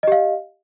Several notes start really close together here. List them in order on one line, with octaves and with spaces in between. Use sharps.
D#5 G4 F5